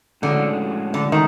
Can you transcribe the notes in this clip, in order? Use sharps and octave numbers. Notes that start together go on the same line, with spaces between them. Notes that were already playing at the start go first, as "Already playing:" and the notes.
A2 D3 F3 G#3 C#4 F#4
D3
D#3